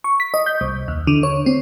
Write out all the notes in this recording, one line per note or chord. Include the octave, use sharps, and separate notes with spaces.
C#6
B6
D#5
G6
C2
D#2
D3
C#5
C4